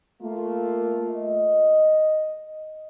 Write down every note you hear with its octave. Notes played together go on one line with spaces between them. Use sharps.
A3 A#3 F4
D#5